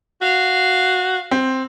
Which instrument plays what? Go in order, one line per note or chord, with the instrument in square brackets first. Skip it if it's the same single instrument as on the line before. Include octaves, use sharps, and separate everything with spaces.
[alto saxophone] F#4 [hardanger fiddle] F5
[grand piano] C4